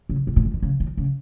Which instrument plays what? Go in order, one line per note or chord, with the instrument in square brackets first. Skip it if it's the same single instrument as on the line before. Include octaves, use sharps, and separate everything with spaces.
[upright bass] C#3
C3
A#2
G#2
D#3
C#3
D#3
C#3